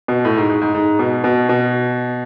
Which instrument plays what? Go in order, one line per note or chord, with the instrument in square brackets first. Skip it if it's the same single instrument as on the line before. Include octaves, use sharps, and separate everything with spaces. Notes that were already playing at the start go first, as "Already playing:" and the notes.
[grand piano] B2
A2
G#2
G#2
G#2
G#2
B2
B2
B2